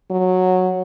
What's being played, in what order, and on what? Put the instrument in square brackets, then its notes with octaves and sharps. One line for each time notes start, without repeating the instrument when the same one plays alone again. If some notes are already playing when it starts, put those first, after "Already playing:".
[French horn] F#3